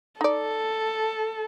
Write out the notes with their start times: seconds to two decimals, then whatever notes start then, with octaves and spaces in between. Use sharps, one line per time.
0.21 D#4 A4 D5